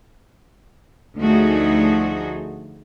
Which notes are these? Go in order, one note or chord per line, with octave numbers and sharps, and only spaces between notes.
D2 F3 A3 D#4 F#4 G#4